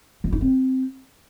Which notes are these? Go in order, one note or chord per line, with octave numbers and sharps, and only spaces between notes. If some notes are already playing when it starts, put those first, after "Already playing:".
F3
D#4
C4